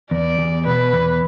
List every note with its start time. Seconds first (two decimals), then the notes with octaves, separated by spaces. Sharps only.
0.11 E2 D5
0.39 E2
0.66 B2 B4
0.93 E2